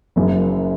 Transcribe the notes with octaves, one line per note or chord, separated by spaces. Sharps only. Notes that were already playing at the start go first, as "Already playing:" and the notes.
F#1 F#2 C#3